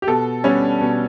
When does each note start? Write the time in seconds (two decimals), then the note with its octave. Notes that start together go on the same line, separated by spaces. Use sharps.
0.02 G4
0.07 B2 A4
0.44 G3 B3 C#4 D4
0.81 B2